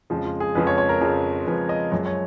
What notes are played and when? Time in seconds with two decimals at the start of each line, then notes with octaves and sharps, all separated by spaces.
0.10 F2 C#3 F3 G#3
0.25 F4
0.40 G#4
0.55 F2 C#3 F3 G#3 B4
0.67 C#5
0.78 C#5
0.89 A#4
1.01 F2 C#3 F3 G#3
1.46 F2 C#3 F3 G#3 B4
1.69 D#5
1.92 F#2 F3 G#3 C#5
2.06 C#5